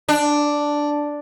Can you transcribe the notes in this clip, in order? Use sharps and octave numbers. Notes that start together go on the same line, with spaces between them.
D4